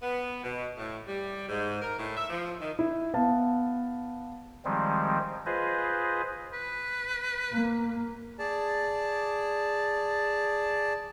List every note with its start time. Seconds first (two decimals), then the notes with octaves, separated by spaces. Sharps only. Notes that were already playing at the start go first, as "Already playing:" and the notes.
0.02 B3
0.43 B2
0.77 A2
1.07 G3
1.49 G#2
1.82 A#4
1.98 A2
2.15 E5
2.30 F3
2.60 D#3
2.79 E4
3.14 B3 F5 A5
4.65 D#3 F3 G3 G#3 C4
5.46 F4 G#4 B4 C5 D#5
6.53 B4
7.53 A#3
8.39 G#4 D5 A5